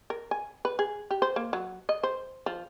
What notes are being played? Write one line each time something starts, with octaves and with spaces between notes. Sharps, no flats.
A#4
G#5
B4
G#4
G4
C5
A#3
F#3
D#5
C5
F3